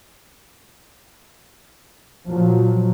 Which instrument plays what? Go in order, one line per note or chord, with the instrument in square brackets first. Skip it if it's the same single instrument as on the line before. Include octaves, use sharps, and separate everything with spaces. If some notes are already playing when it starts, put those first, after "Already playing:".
[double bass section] A#2 F3 F#3